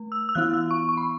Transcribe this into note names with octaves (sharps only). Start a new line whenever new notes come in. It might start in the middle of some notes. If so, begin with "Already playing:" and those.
Already playing: A3
E6
E6
E3 B3 E4 F#6
E6
C#6
C#6
B5